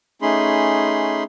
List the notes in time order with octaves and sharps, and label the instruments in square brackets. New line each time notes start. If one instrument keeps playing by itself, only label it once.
[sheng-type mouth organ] A3 C#4 D#4 G#4 B5 C6